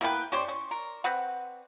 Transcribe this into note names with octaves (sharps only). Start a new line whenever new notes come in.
A#3 B3 E4 A#4 B4 G5
C#4 G4 C5 D5 C6 C#6
C#4
A#4
C4 B4 F#5